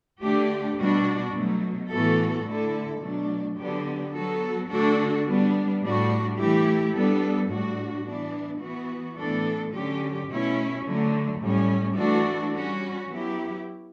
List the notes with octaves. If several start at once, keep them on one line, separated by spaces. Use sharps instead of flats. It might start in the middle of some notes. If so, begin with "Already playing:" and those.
D3 A3 D4 G4
B2 G3 D4 F#4
B2 F#3 A3
A2 E3 B3 F#4 A4
D3 A3 E4 A4
B2 F#3 A3 D4
D3 F#3 B3 D4 G4
F#3 B3 F#4 A4
D3 A3 D4 F#4 A4
G3 B3 D4
A2 G3 D4 F#4
E3 A3 E4 G4
G3 B3 D4 A4
A2 G3 D4 F#4
E3 B3 D4
E3 B3 F#4
A2 E3 B3 D4 A4
D3 F#3 C#4 G4
B2 A3 C#4 E4
D3 F#3 A3
A2 G3 C#4
E3 A3 D4 F#4 A4
G3 C#4 F#4
F#3 B3 E4 G4